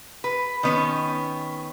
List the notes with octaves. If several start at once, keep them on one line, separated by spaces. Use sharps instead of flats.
B4
D#3 B3 C#4